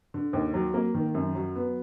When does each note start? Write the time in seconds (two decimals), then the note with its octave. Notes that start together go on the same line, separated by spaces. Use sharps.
0.14 D3
0.33 D#2
0.54 F#3
0.74 A#3
0.94 D#3
1.15 F#2
1.35 F#3
1.55 B3